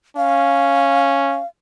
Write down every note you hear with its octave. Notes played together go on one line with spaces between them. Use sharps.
C#4 F5